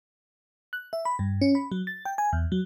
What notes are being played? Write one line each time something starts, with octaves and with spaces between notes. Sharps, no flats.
F#6
E5
B5
G2
C#4
B5
F#3
A6
G5
G#5
E2
F#3